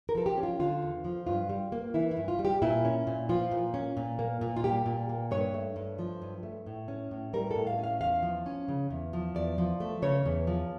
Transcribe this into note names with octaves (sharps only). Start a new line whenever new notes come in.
A#4
F3 A4
G4
C#4
F4
D3 F4
E2
F3
G2 F4
G3
A#3
E3 E4
E4
G2
F4
G3
G4
A#2 E4
C#4
A#2
F3 F4
A#2
C#4
A#2
A#3
A#2
F4
G3 G4
A#2
A#3
G2 C#5
A3
G2
F3
G2
A3
A2
C#4
A2
G3 A#4
A2 A4
F5
C#4
F5
E2 F5
F3
C#4
C#3
E2
F3
E2 D5
F3
A3
C#3 C#5
E2
F3